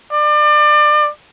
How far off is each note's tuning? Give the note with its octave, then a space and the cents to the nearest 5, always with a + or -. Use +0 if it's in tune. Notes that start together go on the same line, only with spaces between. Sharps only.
D5 +30